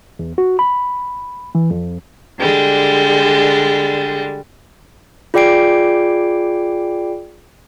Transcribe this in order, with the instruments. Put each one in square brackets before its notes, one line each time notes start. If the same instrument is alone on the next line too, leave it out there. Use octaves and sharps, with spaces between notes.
[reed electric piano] E2
F#4
B5
E3
F2
[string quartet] D3 G3 G#3
[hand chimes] F4 G#4 D5 G5 C7 D7